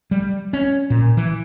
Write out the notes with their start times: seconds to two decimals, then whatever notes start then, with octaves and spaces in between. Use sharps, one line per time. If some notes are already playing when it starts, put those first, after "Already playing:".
0.11 G3
0.53 C#4
0.90 A#2
1.17 E3